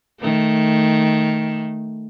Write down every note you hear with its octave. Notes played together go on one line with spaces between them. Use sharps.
D#3 A3